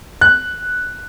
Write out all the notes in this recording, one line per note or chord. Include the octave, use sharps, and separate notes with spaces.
F#6